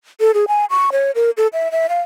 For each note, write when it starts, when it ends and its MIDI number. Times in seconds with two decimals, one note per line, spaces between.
0.20 0.32 69
0.34 0.45 68
0.48 0.65 80
0.70 0.90 85
0.92 1.11 73
1.15 1.31 70
1.37 1.47 69
1.53 1.71 76
1.72 1.87 76
1.89 2.01 77